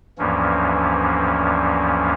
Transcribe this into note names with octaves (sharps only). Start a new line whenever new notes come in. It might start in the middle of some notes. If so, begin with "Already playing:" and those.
D2 G2 E3 F3 A#3 C#4